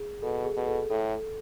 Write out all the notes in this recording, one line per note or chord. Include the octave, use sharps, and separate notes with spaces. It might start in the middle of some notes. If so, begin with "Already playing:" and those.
Already playing: G#4
B2 A4
G#4
B2
A4
A2 A4